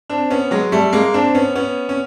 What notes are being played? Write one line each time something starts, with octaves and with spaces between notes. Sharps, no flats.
C4 D4
B3 C#4
F#3 G#3
G3 A3
G#3 A#3
C4 D4
B3 C#4
B3 C#4
C#4